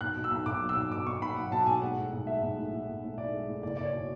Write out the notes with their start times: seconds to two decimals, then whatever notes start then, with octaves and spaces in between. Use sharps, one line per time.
0.01 B1 F#6
0.16 B2
0.24 E6
0.31 B1
0.46 B1 D6
0.61 F#3
0.69 E6
0.76 B1
0.91 B2 D6
1.07 B2 C#6
1.21 B2 B5
1.36 F#3 F#5
1.51 B2 A5
1.66 B1 G#5
1.82 G#3 F#5
1.96 A2
2.12 B1
2.27 G#3 E5
2.42 B1
2.57 A2
2.73 A2
2.88 B1
3.03 A2
3.17 B1 D5
3.33 G#3
3.48 A2
3.63 F#1 D5
3.77 F#1 D5
3.85 C#5
3.93 B2